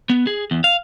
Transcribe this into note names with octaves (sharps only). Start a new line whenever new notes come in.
B3
G#4
E2
F5